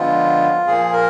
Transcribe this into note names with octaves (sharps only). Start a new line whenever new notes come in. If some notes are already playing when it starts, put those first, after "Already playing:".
Already playing: D3 F3 G#3 B3 F4
A#2 F3 A#3 G#4
A#4